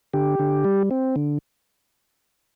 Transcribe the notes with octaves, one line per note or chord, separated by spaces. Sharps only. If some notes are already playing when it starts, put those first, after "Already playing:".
D3 G4
D3
G3
C4
D3